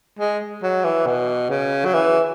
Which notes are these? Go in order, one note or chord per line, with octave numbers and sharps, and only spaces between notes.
G#3
F#3
E3
B2
C#3
F#3
E3